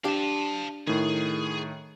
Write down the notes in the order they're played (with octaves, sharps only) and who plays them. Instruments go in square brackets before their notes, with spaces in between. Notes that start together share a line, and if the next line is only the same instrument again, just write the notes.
[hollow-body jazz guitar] D4 G4 [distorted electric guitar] F5 A5
[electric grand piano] A2 D#3 [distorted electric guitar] G#4